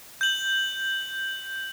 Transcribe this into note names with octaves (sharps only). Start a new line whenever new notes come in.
G6 F#7